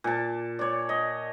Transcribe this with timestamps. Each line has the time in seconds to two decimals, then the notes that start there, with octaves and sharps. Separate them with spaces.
0.04 A#2 A5
0.59 C#5 D5
0.89 D#5